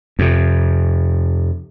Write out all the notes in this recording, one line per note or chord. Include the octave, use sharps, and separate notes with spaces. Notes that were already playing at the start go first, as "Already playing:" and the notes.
F2 C3